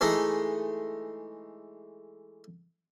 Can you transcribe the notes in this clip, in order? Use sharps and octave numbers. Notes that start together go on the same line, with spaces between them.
E3 G#3 A3 D#4